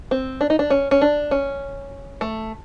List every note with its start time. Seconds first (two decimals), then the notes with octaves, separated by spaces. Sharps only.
0.11 C4
0.41 D4
0.50 D#4
0.59 D4
0.70 C#4
0.91 C#4
1.01 D4
1.31 C#4
2.21 A3